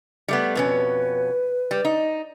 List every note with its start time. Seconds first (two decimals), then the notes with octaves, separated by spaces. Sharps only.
0.28 G3 A3 B3
0.55 F2 B2 C#4 B4
1.71 G3
1.85 D#4